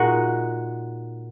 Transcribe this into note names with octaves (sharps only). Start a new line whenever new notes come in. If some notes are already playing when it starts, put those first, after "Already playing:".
Already playing: A#2 G#3 D#4 F#4